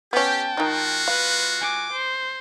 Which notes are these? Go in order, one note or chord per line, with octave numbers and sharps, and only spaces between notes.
B3 C#4 G4 G5 A5
D#3 G#3 D#4 F4 F#4
B4 F5
G#5 D6
C5